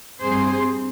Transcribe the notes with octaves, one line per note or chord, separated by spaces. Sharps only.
G2 G3 C4 G#4 C5